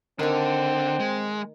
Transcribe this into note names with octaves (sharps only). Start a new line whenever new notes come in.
D3 D#3 C4 C#5
G#3